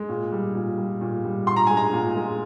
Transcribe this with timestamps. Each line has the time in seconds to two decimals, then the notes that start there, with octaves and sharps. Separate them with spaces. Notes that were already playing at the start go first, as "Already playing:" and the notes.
Already playing: G#3
0.09 A#2
0.32 G3
0.55 A#2
0.77 G3
1.01 A#2
1.24 G3
1.47 A#2 C6
1.56 A#5
1.67 G#3 G#5
1.77 A#5
1.93 A#2
2.15 G#3